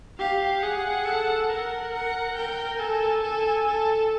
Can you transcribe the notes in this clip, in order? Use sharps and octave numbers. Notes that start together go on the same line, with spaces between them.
G4 F5
G#4 F#5
A4
A#4 F#5
F#5
A#4 G5
A4 G#5
A4
A4